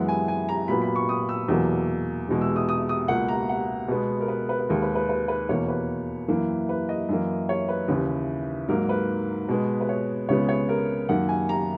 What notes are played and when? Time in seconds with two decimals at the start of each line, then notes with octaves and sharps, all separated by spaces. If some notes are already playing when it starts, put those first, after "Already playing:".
Already playing: F#2 E3 G#3 B3 F#5
0.08 G#5
0.28 G#5
0.49 A#5
0.68 A#2 F#3 B3 B5
0.82 B5
0.96 C#6
1.09 D#6
1.29 E6
1.49 E2 B2 F#3 A#3
2.29 E2 B2 G#3
2.41 E6
2.56 D#6
2.69 D#6
2.89 D#6
3.08 C#2 B2 A#3 F#5
3.28 A#5
3.49 F#5
3.88 B2 G#3 B3
4.20 A#4
4.28 B4
4.49 B4
4.60 B4
4.69 D#2 D#3 G#3 A#4
4.82 B4
4.95 B4
5.09 B4
5.28 B4
5.49 E2 B2 A#3 C#5
5.68 B4
6.28 F#2 E3 A#3
6.69 B4
6.89 D#5
7.09 F#2 E3 A#3
7.49 C#5
7.69 B4
7.88 D#2 C#3 E3
8.69 G#2 F#3 A#3 A#4
8.89 B4
9.49 B2 G#3 B3
9.81 B4
9.89 C#5
10.29 C#2 C#3 G#3 B3 C#5
10.49 C#5
10.69 A#4
11.09 F#2 D#3 A#3 F#5
11.29 G#5
11.49 A#5